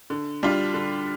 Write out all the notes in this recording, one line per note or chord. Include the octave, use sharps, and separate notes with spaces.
D3
G3 D4 F4
D3